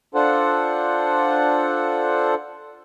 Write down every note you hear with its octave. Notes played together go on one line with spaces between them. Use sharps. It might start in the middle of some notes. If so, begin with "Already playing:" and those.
D4 F4 A4 C5 F#5